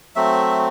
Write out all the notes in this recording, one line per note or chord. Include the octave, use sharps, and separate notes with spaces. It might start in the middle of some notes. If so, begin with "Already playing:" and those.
F#3 A3 C4 E5